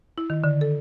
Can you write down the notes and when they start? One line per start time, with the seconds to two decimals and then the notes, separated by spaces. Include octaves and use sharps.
0.18 E4
0.30 D#3
0.44 D3
0.61 A4